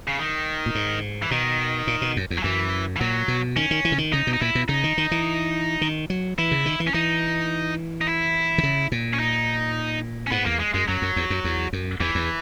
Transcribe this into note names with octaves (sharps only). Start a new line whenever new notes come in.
C#3
D#3
A#2
G#2
E3
B2 D#3
A#2
B2
F#2
E2
F#3
F#2 E3
E3
A#2 F#3
B2
D#3 C#4
D#3
E3
C#3
D#3
C#3 D#4
B2
D#4
A#2 E4
B2
C#3 D#4
D#3
D#3
E3
D#3
F#3
E3 E4
C#3
D#3
E3
C#4
E3 D#4
D#4
E4
D#3
C#3
A#2
C#4
D#4
C#4
G#2 B3
E2 A#3
G#3
F#2 G#3
F#2 F#3
F#2
E2
F#2
E2
F#2
E2 E3
E2